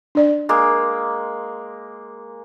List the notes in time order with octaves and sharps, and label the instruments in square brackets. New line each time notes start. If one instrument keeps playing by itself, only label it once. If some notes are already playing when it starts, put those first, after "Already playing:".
[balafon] D4 D5
[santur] G#3 A#3